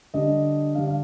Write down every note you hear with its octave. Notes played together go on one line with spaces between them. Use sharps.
D3 G3 D4 D#5
D3 G3 D4 F5
F5